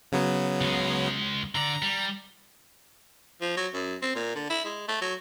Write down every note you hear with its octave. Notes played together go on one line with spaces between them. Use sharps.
C#3 F#3 B3
C#2 G#3
D3 D5 A#5
G3
F3
F#3
F#2
C4
A#2
D3
E4
G#3
A3
F#3